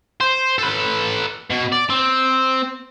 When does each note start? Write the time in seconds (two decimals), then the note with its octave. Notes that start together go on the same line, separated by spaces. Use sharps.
0.21 C5
0.58 A4 B4
1.50 B2
1.72 D5
1.90 C4